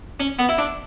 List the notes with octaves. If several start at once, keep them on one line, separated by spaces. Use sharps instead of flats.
C#4
B3
E4
D4